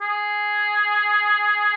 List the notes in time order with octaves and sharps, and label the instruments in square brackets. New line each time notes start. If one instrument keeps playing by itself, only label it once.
[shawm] G#4